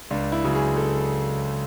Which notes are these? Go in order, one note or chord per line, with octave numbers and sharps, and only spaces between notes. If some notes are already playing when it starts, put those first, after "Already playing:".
C#2 D4
E4
C#3 F#3
G#4
A4